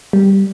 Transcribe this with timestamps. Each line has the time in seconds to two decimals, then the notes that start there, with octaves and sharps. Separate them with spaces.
0.13 G3